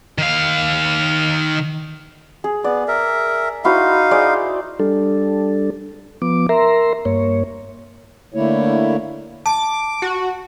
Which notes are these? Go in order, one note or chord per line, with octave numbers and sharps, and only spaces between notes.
D#3 F5
G#4
B3 D5
A#4 E5
D#4 E4 F#4 C5 F5
G#4 C5 D5
G3 D4 A4
F3 B3 D6
A#4 E5 A#5 C6
G2 A#3 C#5
D3 A3 A#3 E4 C#5
A5 D6
F#4